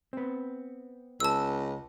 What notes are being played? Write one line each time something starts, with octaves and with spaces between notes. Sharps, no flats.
B3 C4
C#2 A5 E6